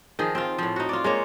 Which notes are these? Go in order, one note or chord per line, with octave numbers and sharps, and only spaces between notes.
D#3 F3 G#4
C4 F4
A2 F3
D#4 F#4
F4 D5
G#3 A#3 C#5